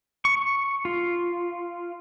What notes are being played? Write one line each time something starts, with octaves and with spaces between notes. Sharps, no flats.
C#6
F4